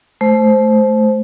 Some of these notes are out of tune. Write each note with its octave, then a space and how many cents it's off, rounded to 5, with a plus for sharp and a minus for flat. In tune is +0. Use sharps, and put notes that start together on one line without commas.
A3 -30 C5 +0